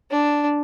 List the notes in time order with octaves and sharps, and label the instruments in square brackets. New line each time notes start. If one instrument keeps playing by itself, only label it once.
[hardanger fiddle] D4